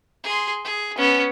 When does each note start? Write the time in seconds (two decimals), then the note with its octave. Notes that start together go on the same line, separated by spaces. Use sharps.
0.24 G#4 C6
0.65 G#4
0.97 B3 C#4